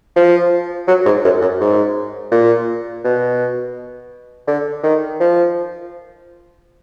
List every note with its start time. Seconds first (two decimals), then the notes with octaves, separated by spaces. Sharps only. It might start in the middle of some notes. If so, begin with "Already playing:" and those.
0.16 F3
0.88 F#3
1.05 G#2
1.24 F#2
1.41 F#2
1.60 G#2
2.32 A#2
3.04 B2
4.47 D3
4.84 D#3
5.20 F3